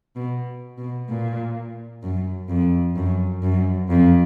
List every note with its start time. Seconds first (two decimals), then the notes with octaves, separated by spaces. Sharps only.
0.16 B2
0.78 B2
1.09 A#2
2.03 F#2
2.49 F2
2.96 F#2
3.43 F#2
3.89 F2